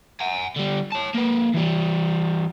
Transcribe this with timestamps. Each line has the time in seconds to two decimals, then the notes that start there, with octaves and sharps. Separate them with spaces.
0.21 F#5 G#5
0.57 D3 G3
0.92 C#5 A5
1.15 A#3 B4
1.54 E3 G3